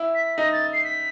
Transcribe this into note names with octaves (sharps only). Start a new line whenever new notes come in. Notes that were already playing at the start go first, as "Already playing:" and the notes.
Already playing: E4
B6
D#4 A#6
A6
C7
B6